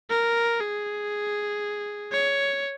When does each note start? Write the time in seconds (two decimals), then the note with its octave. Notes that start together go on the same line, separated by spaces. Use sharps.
0.10 A#4
0.60 G#4
2.12 C#5